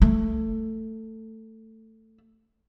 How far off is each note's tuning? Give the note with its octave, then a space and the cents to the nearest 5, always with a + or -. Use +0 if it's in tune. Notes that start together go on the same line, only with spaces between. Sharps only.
A3 +15